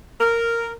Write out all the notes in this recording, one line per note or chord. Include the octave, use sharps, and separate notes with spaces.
A#4